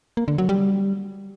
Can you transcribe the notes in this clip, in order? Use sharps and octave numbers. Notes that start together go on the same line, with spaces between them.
A#3
D3
F#3
G3